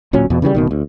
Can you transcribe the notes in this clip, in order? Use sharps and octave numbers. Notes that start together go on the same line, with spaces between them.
D1 A#2 F#3 C#4
E2 B2
C#3 E3 F#3 G3
D1 B2 D#3
D2